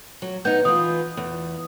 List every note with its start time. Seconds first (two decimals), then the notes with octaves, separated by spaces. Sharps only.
0.22 F#3
0.45 B3 D#4 G6
0.65 E3 F4 D#6
1.17 E2